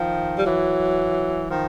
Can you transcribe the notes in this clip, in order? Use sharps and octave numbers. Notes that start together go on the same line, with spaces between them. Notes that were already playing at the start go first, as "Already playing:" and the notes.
Already playing: D#3 F3
G3
E3 F#3
D#3 F3